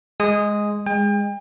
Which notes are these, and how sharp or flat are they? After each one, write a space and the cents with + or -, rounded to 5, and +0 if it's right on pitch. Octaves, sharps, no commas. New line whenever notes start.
G#3 +0 G#4 -5 D#6 +0
G#3 -20 G5 +40